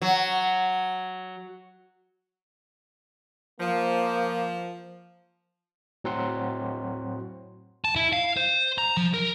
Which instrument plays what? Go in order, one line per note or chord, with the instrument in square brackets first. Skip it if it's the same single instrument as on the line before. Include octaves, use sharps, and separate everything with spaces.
[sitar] F#3
[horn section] F3 [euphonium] A#3
[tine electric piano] A2 F#3 C4 F#5 C6
[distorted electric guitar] A5
E4
F5
C5
A#5
F3
A#4